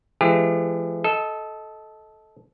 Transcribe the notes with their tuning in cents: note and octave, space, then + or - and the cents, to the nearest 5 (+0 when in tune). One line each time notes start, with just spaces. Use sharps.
E3 +40 G#3 +35 G4 +45
A4 -15 D#5 +20